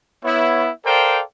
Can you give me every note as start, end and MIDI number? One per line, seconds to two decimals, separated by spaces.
0.24 0.69 59
0.24 0.69 64
0.24 0.69 73
0.85 1.21 69
0.85 1.21 70
0.85 1.21 72
0.85 1.21 74
0.85 1.21 77
0.85 1.21 79